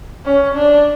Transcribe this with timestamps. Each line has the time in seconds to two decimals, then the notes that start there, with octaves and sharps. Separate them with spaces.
0.25 C#4
0.55 D4